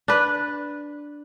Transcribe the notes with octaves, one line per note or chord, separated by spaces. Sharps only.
D4 B4